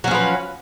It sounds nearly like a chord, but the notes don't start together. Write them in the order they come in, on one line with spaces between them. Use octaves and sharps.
F#3 C#4 F3 B4